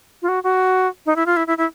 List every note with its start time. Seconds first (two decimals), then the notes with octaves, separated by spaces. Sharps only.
0.22 F4
0.28 F#4
0.44 F#4
1.06 D#4
1.16 E4
1.26 F4
1.37 E4
1.47 E4
1.58 E4